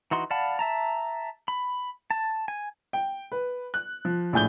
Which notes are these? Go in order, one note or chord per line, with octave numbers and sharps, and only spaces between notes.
E3 D#4 F#4 C6
D5 F5 F#5 A5 B5
E5 A5 A#5
B5
A5
G#5
G5
B4
F#6
F3
A#1 A2 G#5 G6 G7